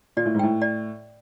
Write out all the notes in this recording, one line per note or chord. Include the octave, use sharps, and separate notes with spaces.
A#2 D5
A2
G#2
A2 G5
D5